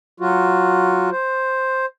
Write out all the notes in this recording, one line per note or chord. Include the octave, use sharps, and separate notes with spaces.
F#3 F4 F#4
C5